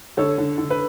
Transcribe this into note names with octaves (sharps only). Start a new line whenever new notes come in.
D3 A4 C#5
D3
D3
B4